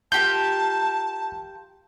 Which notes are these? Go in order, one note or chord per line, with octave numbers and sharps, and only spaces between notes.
F4 G4 A#4 A5 G6